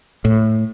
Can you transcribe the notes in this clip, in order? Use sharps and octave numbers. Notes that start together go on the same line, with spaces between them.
A2